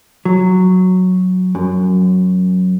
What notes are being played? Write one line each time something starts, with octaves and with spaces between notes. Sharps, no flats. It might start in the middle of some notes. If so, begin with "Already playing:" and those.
F#3
F#2